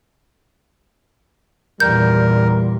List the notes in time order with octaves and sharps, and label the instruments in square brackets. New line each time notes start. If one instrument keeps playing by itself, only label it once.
[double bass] E2 A#2 [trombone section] G3 [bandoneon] A#4 [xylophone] G6